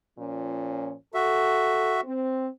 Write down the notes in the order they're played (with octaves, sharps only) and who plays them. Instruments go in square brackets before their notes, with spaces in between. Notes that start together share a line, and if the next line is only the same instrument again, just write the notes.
[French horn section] A#2 F3 C#4
[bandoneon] F#4 E5 [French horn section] A4
[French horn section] C4